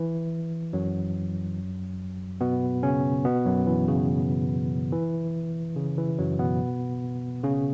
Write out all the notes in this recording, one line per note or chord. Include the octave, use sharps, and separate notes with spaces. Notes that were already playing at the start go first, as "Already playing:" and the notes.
Already playing: E3
F#2 F#3
B2 B3
C#3 C#4
B2 B3
F#2 F#3
E3
C#3
E3
C#3
E3
F#2 F#3
B2 B3
C#3 C#4